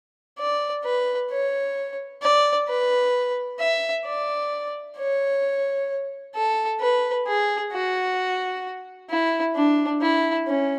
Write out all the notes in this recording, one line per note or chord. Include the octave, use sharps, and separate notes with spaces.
D5
B4
C#5
D5
B4
E5
D5
C#5
A4
B4
G#4
F#4
E4
D4
E4
C#4